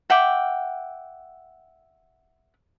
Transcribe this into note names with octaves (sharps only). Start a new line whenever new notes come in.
E5 F#5 G5 D6